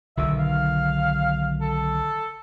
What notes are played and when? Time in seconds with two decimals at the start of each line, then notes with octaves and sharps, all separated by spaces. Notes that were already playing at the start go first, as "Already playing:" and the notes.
0.17 B1 D3 D#3 E5
0.39 F5
1.61 A4